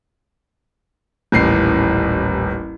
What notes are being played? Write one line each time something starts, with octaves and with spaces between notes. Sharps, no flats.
D#1 A1 C7